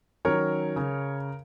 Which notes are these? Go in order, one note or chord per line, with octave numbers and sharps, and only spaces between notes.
D#3 F#3 C#4 A#4 C#5
C#3